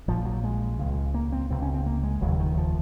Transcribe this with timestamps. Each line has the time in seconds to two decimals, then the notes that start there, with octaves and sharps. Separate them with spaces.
0.08 A#1 A#2 F3
0.25 F#3
0.44 G#3
0.79 C#2 C#3
1.14 A#3
1.32 C4
1.50 C#2 C3 C4
1.62 C#4
1.74 C4
1.86 A#3
2.03 G#3
2.21 F1 D#2 C#3 F#3
2.40 D#3
2.57 F3